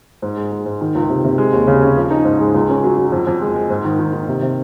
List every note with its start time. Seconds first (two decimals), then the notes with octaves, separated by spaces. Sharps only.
0.22 G#2
0.37 G#3
0.52 G#3
0.66 G#2
0.81 D#3
0.95 C#2
1.09 C3
1.24 C3
1.38 G#3
1.53 D#2
1.67 C#3
1.82 C#4
1.97 F3
2.10 D#4
2.25 G#2
2.40 G#3
2.54 C#2
2.69 C#4
2.84 F#3
2.98 F#3
3.12 F2
3.27 F2
3.41 G#3
3.56 G#3
3.70 G#2
3.85 D#3
3.99 D#3
4.13 D#3
4.28 C3
4.42 C3